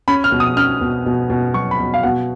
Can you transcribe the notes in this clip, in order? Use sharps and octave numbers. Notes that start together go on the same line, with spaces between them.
C#4 B5
F6
B2
D#6
C#4 F6
B2
B2
B2
F#3 C#6
B5
B2
F5
B2 F#5